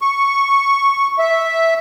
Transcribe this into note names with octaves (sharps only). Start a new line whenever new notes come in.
C#6
E5